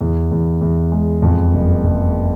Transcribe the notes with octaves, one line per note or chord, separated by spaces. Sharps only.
E2
E2
E2
G#3
F2
F#1
F#1